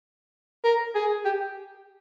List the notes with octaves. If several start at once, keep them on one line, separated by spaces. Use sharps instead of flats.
A#4
G#4
G4